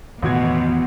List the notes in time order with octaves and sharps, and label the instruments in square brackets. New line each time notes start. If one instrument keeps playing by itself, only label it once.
[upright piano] A1 F#4 G#6 [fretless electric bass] E2 D#3 E3 [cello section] B2